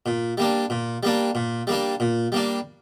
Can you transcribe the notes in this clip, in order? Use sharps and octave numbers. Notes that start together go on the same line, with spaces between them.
A#2
G3 A#3 D4
A#2
G3 A#3 D4
A#2
G3 A#3 D4
A#2
G3 A#3 D4